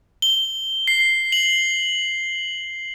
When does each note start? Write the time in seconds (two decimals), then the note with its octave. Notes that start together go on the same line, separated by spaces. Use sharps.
0.22 G7
0.88 C7
1.32 F#7